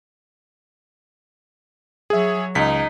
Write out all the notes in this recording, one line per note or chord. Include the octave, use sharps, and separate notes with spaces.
F#3 G#4 C#5 E5
C#2 D#4 B6